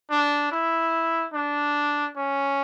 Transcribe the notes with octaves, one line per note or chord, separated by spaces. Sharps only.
D4
E4
D4
C#4